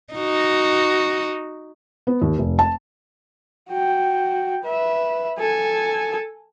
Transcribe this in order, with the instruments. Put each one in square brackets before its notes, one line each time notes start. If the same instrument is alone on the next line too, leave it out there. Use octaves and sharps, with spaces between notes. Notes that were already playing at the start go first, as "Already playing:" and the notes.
[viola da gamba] D#4 F#4
[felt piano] B3
D#2
F1
A5
[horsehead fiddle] F#4 G5
B4 E5
A4 G#5